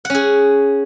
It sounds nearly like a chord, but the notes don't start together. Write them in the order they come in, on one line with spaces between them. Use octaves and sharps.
F#5 C#4 G#4